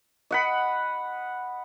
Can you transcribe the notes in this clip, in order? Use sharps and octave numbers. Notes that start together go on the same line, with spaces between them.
D#5 F#5 B5